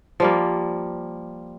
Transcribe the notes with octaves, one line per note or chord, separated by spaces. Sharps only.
F3 G3 A#3